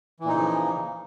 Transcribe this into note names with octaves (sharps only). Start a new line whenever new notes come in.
A#2 C#3 E3 F3 D#4